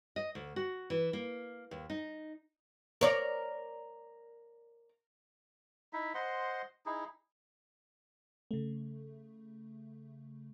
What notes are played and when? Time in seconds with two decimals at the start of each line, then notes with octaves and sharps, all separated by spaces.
0.16 D#5
0.35 D2
0.56 F#4
0.90 E3
1.13 A#3
1.71 D#2
1.90 D#4
3.01 A#4 C#5 D5
5.93 D#4 E4 E5
6.14 C5 D#5 F#5 C6
6.86 D#4 E4 G#4
8.51 C#3 A3